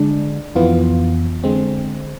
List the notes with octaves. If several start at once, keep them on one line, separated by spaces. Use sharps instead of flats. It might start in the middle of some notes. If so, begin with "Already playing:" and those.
Already playing: D3 G#3 D4
F2 E3 B3 F4
D3 G#3 C4